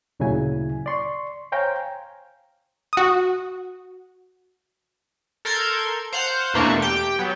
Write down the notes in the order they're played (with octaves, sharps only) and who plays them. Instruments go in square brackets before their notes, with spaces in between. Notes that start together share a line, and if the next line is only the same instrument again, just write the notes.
[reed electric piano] D2 A#2 C#3 F#3 E4 G#5
D5 C6 C#6
C5 C#5 F5 G5 G#5 A#5
[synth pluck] F#4 D#6
[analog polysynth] A4 A#4 C6 G6 G#6
C5 F5 F#5 G6
E2 B2 A3 A#3 D4 C#6
G4 G5
F#3 B3